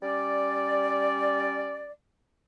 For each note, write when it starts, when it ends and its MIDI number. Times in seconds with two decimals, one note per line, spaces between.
0.03 1.91 55
0.03 1.91 61
0.03 1.91 74